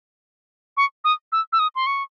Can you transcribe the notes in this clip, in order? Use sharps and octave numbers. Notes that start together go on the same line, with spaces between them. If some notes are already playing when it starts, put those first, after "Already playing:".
C#6
D#6
E6
E6
D#6
C6
C#6